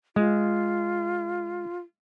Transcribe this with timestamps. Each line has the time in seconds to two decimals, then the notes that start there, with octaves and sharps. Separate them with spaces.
0.16 G#3 F4